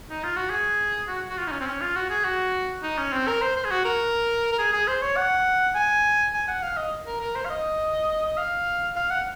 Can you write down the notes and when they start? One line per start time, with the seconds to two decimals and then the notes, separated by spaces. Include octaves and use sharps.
0.10 D#4
0.23 F4
0.36 F#4
0.50 G#4
1.08 F#4
1.30 F#4
1.38 F4
1.47 D#4
1.52 C#4
1.60 C4
1.67 C#4
1.81 F4
1.96 F#4
2.10 G#4
2.24 F#4
2.83 D#4
2.98 C#4
3.13 C4
3.28 A#4
3.42 C5
3.56 C5
3.65 G#4
3.71 F#4
3.85 A#4
4.52 A#4
4.59 G#4
4.73 G#4
4.88 C5
5.02 C#5
5.17 F#5
5.75 G#5
6.34 G#5
6.48 F#5
6.62 F5
6.77 D#5
7.06 A#4
7.21 A#4
7.35 C5
7.45 F5
7.50 D#5
8.26 D#5
8.38 F5
8.96 F5
9.10 F#5